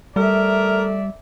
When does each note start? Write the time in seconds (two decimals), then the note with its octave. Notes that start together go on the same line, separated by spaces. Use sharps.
0.16 G3 A3 A#4 D5 E5